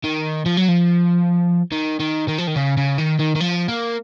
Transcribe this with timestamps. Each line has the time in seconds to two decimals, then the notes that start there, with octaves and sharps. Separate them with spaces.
0.04 D#3
0.46 F3
0.57 F#3
0.69 F3
1.72 D#3
2.00 D#3
2.28 D#3
2.38 F3
2.47 D#3
2.56 C#3
2.77 C#3
2.98 D#3
3.19 D#3
3.35 D#3
3.40 F3
3.68 A#3